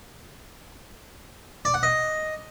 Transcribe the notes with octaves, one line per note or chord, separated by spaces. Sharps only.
D5
F#5
D#5